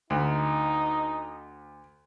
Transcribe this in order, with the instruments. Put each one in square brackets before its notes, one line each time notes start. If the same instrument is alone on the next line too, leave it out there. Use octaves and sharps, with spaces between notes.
[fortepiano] D2 [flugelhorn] D#4